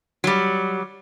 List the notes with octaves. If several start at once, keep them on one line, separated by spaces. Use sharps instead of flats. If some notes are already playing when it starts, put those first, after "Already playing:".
F#3 G3